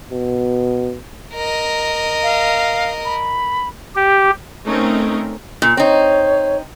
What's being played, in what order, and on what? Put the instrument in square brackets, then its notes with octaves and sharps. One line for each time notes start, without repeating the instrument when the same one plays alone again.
[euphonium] B2
[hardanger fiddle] A#4 D#5
[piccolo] F5
B5
[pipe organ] G4
[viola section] A3 C4 C#4 D#4 A#4
[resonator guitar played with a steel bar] A#2
[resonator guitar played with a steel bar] C4 D#4 [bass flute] C#5